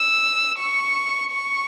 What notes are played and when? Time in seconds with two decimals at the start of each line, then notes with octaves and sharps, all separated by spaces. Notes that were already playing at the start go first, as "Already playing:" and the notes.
Already playing: E6
0.58 C#6
1.32 C#6